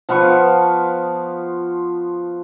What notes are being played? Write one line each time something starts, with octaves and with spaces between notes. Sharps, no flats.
F3 B3 F4 C#6